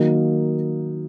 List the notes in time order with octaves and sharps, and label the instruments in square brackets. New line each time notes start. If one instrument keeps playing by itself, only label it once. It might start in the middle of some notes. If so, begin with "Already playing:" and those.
Already playing: [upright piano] D#3 F#3 A#3 D#4